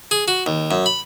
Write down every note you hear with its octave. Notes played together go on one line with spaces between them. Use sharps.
G#4
F#4
D#2
F#2
B5